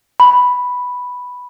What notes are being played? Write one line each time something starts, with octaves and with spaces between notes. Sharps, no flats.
B5